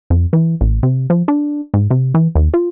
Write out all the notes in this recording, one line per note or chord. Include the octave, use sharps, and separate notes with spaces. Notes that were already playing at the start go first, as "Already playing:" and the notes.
F2
E3
A1
C3
F3
D4
G#2
C3
E3
D#2
F4